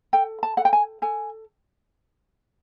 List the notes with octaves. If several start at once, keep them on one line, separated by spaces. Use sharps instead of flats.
A4 G5
A5
A4 F#5
G5
G#5
A4 G#5